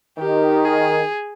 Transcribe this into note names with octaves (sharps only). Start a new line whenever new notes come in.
D#3 G4
G#4